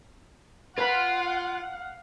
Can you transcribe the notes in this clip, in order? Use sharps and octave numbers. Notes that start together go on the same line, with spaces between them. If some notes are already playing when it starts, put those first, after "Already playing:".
F4 B4 F5 F#5 B5